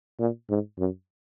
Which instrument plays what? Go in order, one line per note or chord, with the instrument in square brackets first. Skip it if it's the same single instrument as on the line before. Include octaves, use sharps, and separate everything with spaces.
[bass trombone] A#2
G#2
F#2